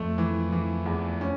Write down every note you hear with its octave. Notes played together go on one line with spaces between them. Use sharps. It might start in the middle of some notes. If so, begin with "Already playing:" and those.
Already playing: F2 A3
E3
E3
E2
C#4